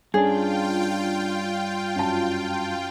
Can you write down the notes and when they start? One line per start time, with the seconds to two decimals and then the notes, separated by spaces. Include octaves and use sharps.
0.14 G2 C#4 D4 F4 G#4 G5
1.96 F#2 A5